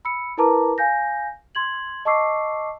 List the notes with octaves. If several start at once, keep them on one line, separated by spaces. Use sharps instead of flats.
B5 E6 C#7
E4 A#4 B4 A5 A#5 D6
F5 G#5 G6 A#6
C6 G#6 F#7
D#5 A5 C#6 D6 E6 C7